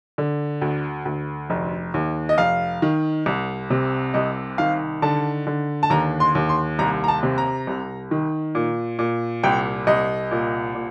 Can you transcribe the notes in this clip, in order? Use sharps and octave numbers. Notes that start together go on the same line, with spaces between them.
D3
D2
D2
F1
D#2
D#5
F1 F5
D#3
C2
C3
C2 D#5
D#3 F5
D3 A5
D3
A5
D#2 A#5
C6
D#2
C6
C2 A#5
A#5
A5
C3
A#5
C2
D#3
A#2
A#2
C2 G5
C2 D#5
A#2
A#2